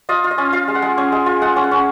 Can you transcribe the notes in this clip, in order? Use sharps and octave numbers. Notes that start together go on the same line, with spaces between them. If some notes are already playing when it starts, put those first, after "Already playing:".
F4 D#5
F4
D#5
C#4
F4 F5
G#3
F#5
G#3
C#4 G#5
G#3
F4
G#3 F#5
C#4
F#5
C#4